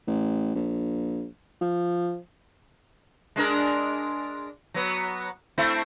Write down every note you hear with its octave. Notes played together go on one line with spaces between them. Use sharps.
A1
A#1
F3
G#3 D4 A#4
F#3 B3
A3 C4 E4